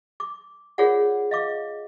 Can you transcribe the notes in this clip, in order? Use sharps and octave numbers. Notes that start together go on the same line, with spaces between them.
D6
F4 G#4 A#4 C#5 D5 F#5
D#5 F5 D6